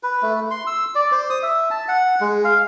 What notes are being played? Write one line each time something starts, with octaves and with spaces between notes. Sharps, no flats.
B4
A3
C6
E6
D5
C5
D#6
E5
A5
F#5
G#3
F5